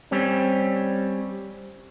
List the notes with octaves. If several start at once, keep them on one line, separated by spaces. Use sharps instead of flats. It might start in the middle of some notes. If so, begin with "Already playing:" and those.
G3 C4 C#4